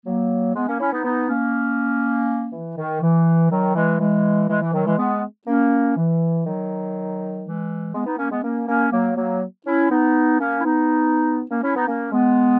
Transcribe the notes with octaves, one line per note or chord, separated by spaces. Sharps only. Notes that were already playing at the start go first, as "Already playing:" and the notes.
F#3 A#3
G#3 B3
A#3 C#4
C#4 E4
B3 D#4
B3 D#4
A#3 C#4
E3
D#3
E3
D#3 F#3
E3 G#3
E3 G#3
E3 G#3
E3
D#3 F#3
E3 G#3
G#3 B3
A#3 C#4
E3
D#3 F#3
E3 G#3
G#3 B3
B3 D#4
A#3 C#4
G#3 B3
A#3 C#4
A#3 C#4
F#3 A#3
F#3 A#3
C#4 E4
B3 D#4
A#3 C#4
E4
B3 D#4
A#3 C#4
C#4 E4
B3 D#4
A#3 C#4
G#3 B3